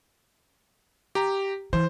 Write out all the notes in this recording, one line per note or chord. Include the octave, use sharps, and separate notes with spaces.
G4 A#5
E3 C5